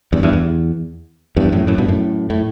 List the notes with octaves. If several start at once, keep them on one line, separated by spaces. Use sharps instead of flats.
E2 G2
E2 G2
E2
E2 G2
F#2 A2
F#2 A2
G2 B2
F#2 A2
A2